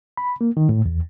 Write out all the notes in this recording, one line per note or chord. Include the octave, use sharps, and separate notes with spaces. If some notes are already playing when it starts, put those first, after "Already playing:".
B5
A#3
D#3
A2
E2